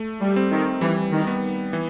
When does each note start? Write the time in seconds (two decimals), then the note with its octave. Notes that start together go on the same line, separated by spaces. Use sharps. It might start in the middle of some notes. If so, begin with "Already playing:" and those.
Already playing: A3
0.21 G3
0.36 C4
0.51 D#3
0.81 E3 G3
1.12 D#3
1.27 B3
1.73 E3